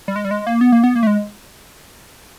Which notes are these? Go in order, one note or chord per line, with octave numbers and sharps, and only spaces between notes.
G3
G#3
G3
G#3
A#3
B3
A#3
B3
A#3
A3
G#3